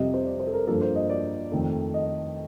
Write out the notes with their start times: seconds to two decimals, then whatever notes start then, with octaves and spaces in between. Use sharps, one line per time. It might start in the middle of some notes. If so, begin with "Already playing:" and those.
Already playing: F2 C3 G3 C4 D#5
0.14 C5
0.26 D5
0.40 C5
0.47 A4
0.53 A#4
0.67 G2 F3 A#3 A4
0.81 C5
0.96 D#5
1.10 D5
1.52 F2 D#3 A3
1.94 D#5